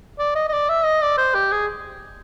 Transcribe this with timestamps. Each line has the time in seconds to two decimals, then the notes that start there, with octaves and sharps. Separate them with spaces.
0.19 D5
0.35 D#5
0.49 D#5
0.52 D5
0.69 E5
0.85 D#5
1.02 D5
1.17 C5
1.34 G4
1.51 G#4